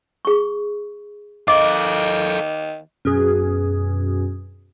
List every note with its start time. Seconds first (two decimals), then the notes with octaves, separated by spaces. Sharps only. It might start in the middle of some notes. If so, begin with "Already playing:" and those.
0.25 G#4 C#6
1.48 D#3 A4 D#5 F5 D6
3.05 F#2 B2 G#4